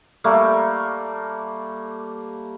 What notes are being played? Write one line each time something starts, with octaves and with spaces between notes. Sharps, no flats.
G3 A3 A#3